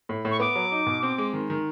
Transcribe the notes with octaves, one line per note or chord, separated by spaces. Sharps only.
A2
A2
C#6
B3 D6
F#3
D#4
B2
C4
G#3
D#3
D#3